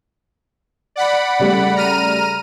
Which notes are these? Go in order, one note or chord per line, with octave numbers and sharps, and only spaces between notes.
D5 F#5 B5
C#3 G3 A3
A#5 F6 D#7